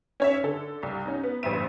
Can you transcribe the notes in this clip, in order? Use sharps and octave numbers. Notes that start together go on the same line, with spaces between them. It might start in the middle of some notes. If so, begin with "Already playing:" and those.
C#4 C#5 E5
D3 A4
C2
C#4 D#4
B3
A1 G2 B3 C5 E5 D#7